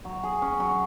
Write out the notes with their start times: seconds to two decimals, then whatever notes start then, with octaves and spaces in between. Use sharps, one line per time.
0.05 F#3
0.23 G#4
0.42 C#4
0.60 F#3